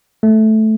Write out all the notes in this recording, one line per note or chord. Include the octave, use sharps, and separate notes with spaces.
A3